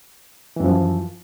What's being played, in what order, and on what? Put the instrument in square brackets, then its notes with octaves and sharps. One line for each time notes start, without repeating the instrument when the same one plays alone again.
[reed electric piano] E3
F#2
F3